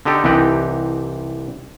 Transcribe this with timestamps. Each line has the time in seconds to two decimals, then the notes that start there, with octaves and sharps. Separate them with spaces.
0.05 D3 D#4 G4 A4
0.24 C2 E3 C4 D#4 G4 F#5